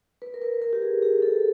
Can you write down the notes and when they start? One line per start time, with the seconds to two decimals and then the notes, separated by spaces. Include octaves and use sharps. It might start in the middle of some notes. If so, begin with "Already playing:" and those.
0.22 B4
0.34 A#4
0.42 B4
0.62 A#4
0.73 G4
0.82 G#4
1.02 G#4
1.22 A4